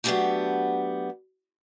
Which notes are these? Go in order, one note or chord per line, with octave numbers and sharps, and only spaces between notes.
F#3 A3 B3 C#4 D4 G4